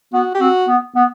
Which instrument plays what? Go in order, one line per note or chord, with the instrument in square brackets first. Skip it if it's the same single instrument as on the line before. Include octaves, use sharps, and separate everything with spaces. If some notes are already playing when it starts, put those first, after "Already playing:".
[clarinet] B3 [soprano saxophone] F#4
[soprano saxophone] G4
[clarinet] C4 [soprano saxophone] F#4
[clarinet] B3
B3